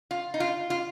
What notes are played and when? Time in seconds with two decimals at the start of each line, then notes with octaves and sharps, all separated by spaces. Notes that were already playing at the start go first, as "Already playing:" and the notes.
0.11 F4
0.34 D#4
0.40 F4
0.70 F4